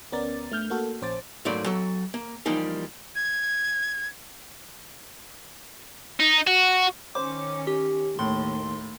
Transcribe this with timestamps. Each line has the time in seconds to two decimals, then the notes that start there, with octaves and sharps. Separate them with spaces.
0.12 D2 B3 C#4 A#4 D5 A6
0.51 A3 D4 F6 G6
0.70 A#3 F#4 A4
1.01 A#1 C#4 C5 D6 A6
1.45 G#2 F#3 A3 A#3 D5 B5
1.66 F#3 A4
2.14 A#3
2.46 E3 F3 G3 A#3 D#4 G4
3.15 G#6
6.20 D#4
6.47 F#4
7.15 D#3 C#4 C5 D6
7.67 G4
8.19 D#2 A2 C6